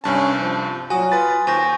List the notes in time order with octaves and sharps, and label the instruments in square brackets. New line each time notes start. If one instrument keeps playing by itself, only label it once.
[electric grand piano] C2 G2 A5 [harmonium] C#4
[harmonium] F3
[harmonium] A#2 F#3 [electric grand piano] F#4 [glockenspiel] G#5 D#6
[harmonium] F4 [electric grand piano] B4 B5 A6
[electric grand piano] D#2 [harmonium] C5 [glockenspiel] G#5 C#6 A#6